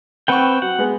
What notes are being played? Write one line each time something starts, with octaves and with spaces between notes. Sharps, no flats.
C4 B4 F#5 G5 C#6
F#3 F#5
G#3 B3 G#4